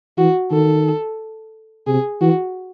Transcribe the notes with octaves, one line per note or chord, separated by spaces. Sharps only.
E3 F#4
D#3 A4
C3 G#4
E3 F#4